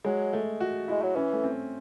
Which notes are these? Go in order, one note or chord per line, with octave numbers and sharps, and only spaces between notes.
F#3 G#3
A3
F#4
G#3 E4
F#3
E3 C#4
A3
C4